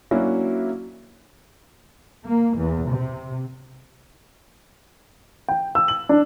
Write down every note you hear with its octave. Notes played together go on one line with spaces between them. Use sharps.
F#3 A#3 C#4 D4 E4 F#4
A#3
E2
C3
G5
E6
F#7
D4